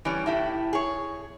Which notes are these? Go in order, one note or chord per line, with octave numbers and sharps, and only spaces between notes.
E3 G3 C#4
A2 E4 G4
G#4 C#5